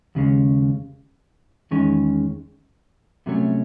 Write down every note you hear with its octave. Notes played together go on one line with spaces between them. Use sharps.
D#2 C#3 G#3 C#4
E2 D#3 G#3 C#4
C2 C3 F#3 A3 C#4